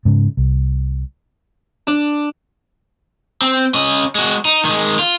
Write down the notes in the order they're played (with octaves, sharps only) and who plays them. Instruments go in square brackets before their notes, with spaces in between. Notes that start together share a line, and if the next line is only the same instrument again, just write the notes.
[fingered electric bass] G#2 C#3
C2
[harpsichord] D4
[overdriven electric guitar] C4
C#4 D#5
G#3 F#4
D#4
D#3 G#3
F4